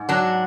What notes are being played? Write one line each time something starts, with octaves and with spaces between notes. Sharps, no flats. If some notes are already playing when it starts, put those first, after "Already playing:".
Already playing: G#2
F#3 D4